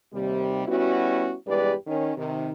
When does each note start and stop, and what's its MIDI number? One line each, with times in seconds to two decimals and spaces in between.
0.13 0.66 39
0.13 0.66 48
0.13 0.66 55
0.67 1.35 55
0.67 1.35 59
0.67 1.35 61
0.67 1.35 64
0.67 1.35 66
1.47 1.73 40
1.47 1.73 43
1.47 1.73 56
1.47 1.73 67
1.47 1.73 71
1.47 1.73 74
1.87 2.13 51
1.87 2.13 61
2.17 2.52 48
2.17 2.52 51